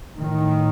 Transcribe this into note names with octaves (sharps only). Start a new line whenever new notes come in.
A2 D#3